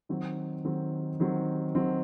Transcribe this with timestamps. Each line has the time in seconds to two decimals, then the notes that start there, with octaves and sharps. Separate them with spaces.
0.09 D#3 F#3 C4
0.65 D#3 F#3 C4
1.20 D#3 F#3 C4
1.75 D#3 F#3 C4